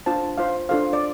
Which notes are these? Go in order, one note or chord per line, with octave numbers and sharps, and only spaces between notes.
D4 F4 C5 A5
F4 C5 F5
D4 F4 A4 C5 F5
D5